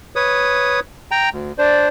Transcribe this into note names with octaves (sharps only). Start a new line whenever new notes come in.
B4 C#5 D#6
G5 A#5
D2
D4 C5 D5